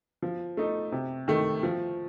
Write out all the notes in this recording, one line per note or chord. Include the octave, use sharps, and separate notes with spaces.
F3
A3 D#4
C3
D#3 A3
F3